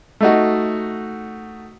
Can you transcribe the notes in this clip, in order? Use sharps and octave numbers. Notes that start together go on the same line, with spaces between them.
A3 D#4 F#4